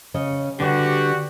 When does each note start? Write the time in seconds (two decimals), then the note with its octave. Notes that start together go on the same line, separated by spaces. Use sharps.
0.14 C#3 C#4 D#5
0.60 D3 G3 F#4 G4 B4 D5